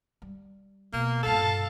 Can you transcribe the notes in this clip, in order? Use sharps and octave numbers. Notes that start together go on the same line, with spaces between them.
G3
B2 A#3
G2 A#2 A4 F5 A5